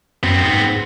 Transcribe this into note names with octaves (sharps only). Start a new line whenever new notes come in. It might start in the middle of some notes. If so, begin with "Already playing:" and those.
F#2 B3 C4
G#2